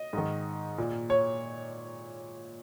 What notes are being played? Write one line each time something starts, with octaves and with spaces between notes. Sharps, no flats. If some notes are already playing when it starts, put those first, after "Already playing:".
Already playing: D#5
G#2 D#3
A#2
C#5